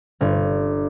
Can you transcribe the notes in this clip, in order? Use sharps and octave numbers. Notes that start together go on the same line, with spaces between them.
G1